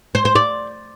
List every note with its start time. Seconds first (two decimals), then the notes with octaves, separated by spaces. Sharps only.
0.15 C5
0.25 C5
0.35 D5